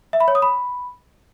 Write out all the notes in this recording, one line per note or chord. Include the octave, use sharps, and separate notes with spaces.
E5
B5
C#5
D#6
B5